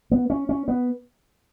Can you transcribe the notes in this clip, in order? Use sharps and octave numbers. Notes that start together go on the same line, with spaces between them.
B3
C#4
C#4
B3